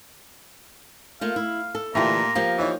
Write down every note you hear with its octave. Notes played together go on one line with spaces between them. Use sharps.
A3 A#3 F4 F5
E4
A4
A#2 D3 E3 A3 F4 G4 A#5
F3 A#3 G4 F5 G6
E3 D#4 C#5